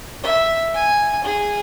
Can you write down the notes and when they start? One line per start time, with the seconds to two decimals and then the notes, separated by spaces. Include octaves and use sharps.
0.23 E5
0.74 G#5
1.24 G#4